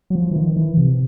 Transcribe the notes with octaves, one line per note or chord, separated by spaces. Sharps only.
F#3
F3
E3
D#3
E3
C3